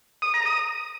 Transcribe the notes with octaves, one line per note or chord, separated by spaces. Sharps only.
D#6
A#5
D#6